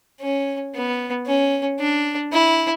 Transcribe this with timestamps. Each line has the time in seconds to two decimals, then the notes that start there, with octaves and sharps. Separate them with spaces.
0.21 C#4
0.74 B3
1.26 C#4
1.80 D4
2.32 E4